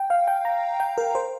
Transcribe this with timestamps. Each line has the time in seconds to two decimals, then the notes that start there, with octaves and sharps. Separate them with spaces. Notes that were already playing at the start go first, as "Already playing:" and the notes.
Already playing: G5
0.10 F5
0.28 G5
0.45 A#5
0.80 G5
0.98 A#4
1.15 C5